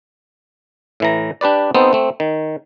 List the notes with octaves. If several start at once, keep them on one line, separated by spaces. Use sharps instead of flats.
A2 E3 A#5
D4 G4 B4 D5
B3 C4 D#4 A4 C5
A3 C4
D#3